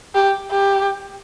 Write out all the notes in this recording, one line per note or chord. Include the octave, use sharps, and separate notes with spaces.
G4
G4